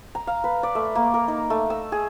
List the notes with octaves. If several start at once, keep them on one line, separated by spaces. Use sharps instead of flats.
A#5
F5
B4
D5
A3
A#3
A#4
D#4
A3
E6
G#4